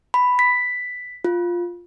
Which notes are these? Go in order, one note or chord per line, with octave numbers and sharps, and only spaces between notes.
B5
B6
F4